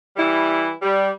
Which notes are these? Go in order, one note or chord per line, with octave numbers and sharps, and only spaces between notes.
E3 G3 E4
G3